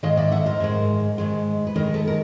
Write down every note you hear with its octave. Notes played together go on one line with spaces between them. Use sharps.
G#2 D#3 G#3 D#5 F5
D5 E5
E5 F#5
A#4 C5
G#2 D#3 G#3
G#2 D#3 G#3
B4
G#2 D#3 G#3 A#4 C5
A4 B4
A#4